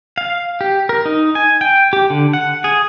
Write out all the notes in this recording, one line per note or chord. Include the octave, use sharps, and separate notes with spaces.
F5
G4
A#4
D#4
G#5
G5
G4
D3
F#5
G#4